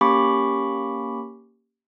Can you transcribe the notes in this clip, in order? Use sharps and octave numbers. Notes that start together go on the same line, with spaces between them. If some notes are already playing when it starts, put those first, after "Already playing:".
A#3 C#4 G4 B5 C#6 D6